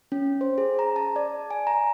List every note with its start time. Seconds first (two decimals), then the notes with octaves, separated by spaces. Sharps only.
0.12 C#4
0.41 C5
0.58 G#4
0.79 A#5
0.96 A5
1.16 D5
1.51 G#5
1.67 A#5